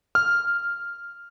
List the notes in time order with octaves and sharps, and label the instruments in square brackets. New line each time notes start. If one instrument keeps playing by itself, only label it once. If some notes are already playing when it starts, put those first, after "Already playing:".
[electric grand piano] F6